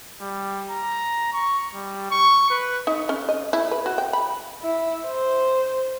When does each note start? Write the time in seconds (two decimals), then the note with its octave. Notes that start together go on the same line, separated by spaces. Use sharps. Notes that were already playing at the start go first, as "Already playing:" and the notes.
0.21 G3
0.70 A#5
1.33 C#6
1.74 G3
2.11 C#6
2.50 B4
2.87 D#4
3.09 C#4
3.29 D#5
3.53 E4
3.71 B4
3.86 F#4
3.98 G5
4.13 B5
4.62 E4
5.06 C5